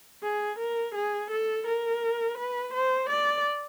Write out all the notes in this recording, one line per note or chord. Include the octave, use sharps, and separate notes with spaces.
G#4
A#4
G#4
A4
A#4
B4
C5
D5